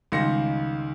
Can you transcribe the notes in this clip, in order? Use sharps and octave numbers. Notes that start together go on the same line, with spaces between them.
C#2 D#3 G3 C6 A#6 C#7